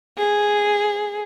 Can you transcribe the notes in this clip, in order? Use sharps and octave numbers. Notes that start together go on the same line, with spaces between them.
G#4